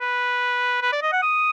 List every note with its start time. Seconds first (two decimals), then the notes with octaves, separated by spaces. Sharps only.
0.01 B4
0.82 B4
0.92 D5
1.02 D#5
1.13 F#5
1.23 D#6